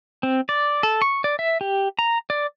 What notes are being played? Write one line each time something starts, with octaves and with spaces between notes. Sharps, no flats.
C4
D5
A4
C#6
D5
E5
G4
A#5
D5